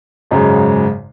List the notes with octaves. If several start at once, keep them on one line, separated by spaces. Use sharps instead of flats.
G#1 F#2 C#3 G#3